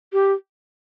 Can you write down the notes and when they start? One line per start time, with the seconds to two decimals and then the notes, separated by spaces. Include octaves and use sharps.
0.13 G4